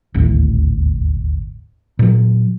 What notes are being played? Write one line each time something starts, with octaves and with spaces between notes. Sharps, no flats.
D#1 G#1 D2 A2
A#2 F#3